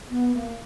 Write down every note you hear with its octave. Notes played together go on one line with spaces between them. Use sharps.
B3
A#3